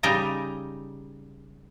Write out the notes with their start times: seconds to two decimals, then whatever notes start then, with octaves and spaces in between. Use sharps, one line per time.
0.03 C#3 G3 D#4 G4 G#5 A#5